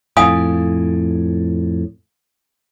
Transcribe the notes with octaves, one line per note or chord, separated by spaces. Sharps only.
F2 A2 F5 G#5 D#6